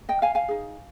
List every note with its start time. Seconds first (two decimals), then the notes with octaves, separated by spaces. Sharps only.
0.09 D#5 G5
0.22 F5 G#5
0.35 F5 G#5
0.48 D#4 G#4